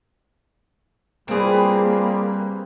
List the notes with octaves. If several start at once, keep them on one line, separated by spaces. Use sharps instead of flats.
C3 G3 A#3 C4 F4 G#4 B4